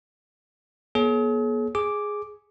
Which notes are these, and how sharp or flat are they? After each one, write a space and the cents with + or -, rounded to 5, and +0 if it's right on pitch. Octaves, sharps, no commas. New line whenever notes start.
B3 -45 G#4 +40 C#5 +0
G#4 +0 D6 +0